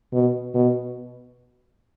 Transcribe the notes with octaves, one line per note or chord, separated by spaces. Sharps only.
B2
B2